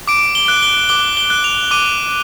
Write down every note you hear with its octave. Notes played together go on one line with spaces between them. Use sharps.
D6 D7
G7
F#6
G7
D6 G7
G7
F#6
F7
D6 D#7